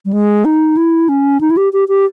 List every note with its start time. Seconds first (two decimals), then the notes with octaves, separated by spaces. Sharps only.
0.05 G3
0.13 G#3
0.45 D#4
0.77 E4
1.09 C#4
1.41 D#4
1.50 E4
1.57 G4
1.73 G4
1.88 G4